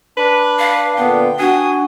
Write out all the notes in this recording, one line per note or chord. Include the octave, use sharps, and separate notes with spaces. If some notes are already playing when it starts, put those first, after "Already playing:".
D4 B4
F5
A#2 D3 B3 F5 G5
D4 F#4 G#5 D#6